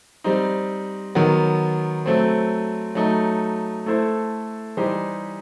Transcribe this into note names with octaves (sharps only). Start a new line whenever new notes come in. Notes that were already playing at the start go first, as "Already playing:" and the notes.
G3 C4 D#4
D#3 F#3 B3
F#3 A3 C4
F#3 A3 D#4
A3 E4 A4 C5
E3 G3 D#4 G4 C5